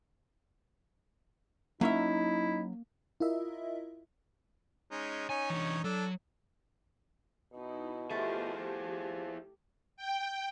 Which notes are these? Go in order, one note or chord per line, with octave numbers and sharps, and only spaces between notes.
F#3 A#3 C#4 D#4 E4 E5
E4 F4 A#4 D#5 E5
G#3 C#4 D#4
C#4 D#4 C#5 G#5
E3 D4
F#3 D4 A4
B2 D#4 E4
A3 E4 F4 G4 G#4 C5
F3 G4
G5